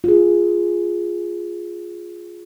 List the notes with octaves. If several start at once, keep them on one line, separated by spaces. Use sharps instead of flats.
F4 G#4